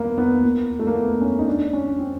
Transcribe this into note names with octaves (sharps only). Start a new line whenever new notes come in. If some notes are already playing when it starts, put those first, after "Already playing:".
Already playing: A#3 B3
B3
A#3
A3
A#3
B3
C#4
D#4
D4
C#4
C4